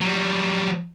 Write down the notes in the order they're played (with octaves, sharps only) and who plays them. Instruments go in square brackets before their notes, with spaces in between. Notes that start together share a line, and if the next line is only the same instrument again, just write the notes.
[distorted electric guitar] F#3 G3